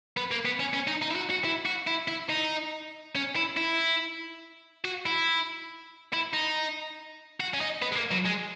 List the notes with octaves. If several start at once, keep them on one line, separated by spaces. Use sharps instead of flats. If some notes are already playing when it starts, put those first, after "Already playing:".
B3
A#3
B3
C#4
C#4
D#4
D#4
E4
F#4
F#4
E4
F#4
E4
E4
D#4
C#4
E4
E4
F#4
E4
E4
D#4
F#4
C#4
D#4
B3
G#3
A#3
F#3
G#3